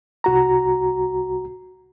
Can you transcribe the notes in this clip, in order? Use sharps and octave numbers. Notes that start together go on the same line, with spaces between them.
C2 F#4 A#5